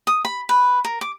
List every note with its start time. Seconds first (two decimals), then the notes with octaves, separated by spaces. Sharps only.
0.07 D#6
0.25 B5
0.49 B4
0.85 A#4
1.01 D6